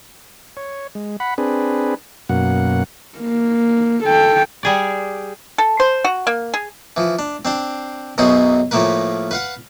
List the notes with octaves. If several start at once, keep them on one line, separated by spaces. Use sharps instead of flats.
C#5
G#3
F#5 B5
C4 D4 G#4 B4
F#2 B2 A#3 F#5
A#3
A4 G5
G3 G#4 D5
A4
C5
F#4
A#3
G#4
E3 F3
D4
C4 D4 C5
B1 F#2 B2 F#4 G#4 C5
A2 F3 A3 A#3 A#4 B4
B4 F5 F#5